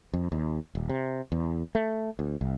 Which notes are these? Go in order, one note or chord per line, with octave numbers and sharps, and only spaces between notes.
F2
D#2
D#1
C3
E2
A3
D2
C2